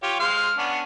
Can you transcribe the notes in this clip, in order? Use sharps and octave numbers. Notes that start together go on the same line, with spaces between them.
F4 G4 C#5
G#3 C5 F5
B3 C#4 D4